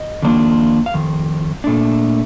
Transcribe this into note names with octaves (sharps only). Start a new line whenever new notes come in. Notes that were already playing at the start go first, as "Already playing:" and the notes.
Already playing: D#5
F2 D#3 A#3 D4 F4
F5
F2 D#3
A#2 A3 D4